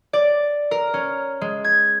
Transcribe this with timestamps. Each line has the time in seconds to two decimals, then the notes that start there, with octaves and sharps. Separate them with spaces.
0.13 D5
0.71 A#4
0.94 C#4
1.41 G#3
1.64 G#6